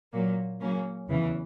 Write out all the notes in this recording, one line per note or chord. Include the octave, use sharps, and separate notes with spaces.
A#2 F#3 A#3
C#3 F#3 A#3 C#4
E2 C#3 E3